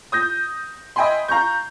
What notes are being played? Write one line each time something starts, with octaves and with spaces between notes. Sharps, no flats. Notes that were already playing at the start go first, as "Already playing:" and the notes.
D#6 G6 A#6
D#5 E5 G5 G#5 B5 C6
F5 A#5 C#6 G6